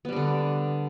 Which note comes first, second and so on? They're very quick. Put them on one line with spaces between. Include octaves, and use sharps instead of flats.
B3 G3 D4 D3